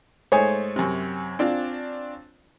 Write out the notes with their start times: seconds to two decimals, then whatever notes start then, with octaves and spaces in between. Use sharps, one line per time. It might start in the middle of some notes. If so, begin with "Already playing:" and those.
0.32 G#2 A3 C5 C#5 G#5 D#6
0.76 F#2 C3
1.39 C4 D4 F4